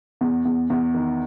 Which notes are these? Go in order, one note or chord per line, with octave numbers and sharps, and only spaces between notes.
E2
E2
E2
D#3